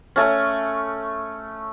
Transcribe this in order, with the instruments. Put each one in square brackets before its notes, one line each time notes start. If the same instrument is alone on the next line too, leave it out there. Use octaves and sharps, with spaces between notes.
[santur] A3 C#4